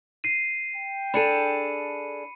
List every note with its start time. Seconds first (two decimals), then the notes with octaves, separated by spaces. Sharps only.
0.24 C7 D#7
0.76 G5
1.14 D4 G#4 A4 B5 C#7 D#7